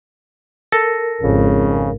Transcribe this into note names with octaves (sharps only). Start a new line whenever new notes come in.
A4 A#4
G#1 F2 C#3